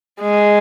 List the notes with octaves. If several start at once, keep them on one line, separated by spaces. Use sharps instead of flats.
G#3